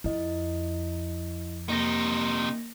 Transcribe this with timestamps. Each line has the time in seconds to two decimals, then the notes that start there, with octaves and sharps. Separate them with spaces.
0.04 F2 E4 D#5
1.69 C3 A#3 D#4 A#6